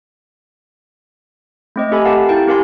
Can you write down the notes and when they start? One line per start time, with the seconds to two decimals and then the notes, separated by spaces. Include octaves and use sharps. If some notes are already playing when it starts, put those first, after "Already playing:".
1.76 A3 C4 D#5
1.91 C4 G4 A4 E5 G#5 B5
2.05 G4 A#4 F5 F#5 A5
2.29 E4 A#4 G5
2.47 C4 G4 A#4 F5 G#5 C6